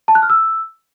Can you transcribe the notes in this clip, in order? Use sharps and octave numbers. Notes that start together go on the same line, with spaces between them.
A5
F#6
F6
E6